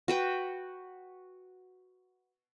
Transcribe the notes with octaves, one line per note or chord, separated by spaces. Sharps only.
F#4 B4 G5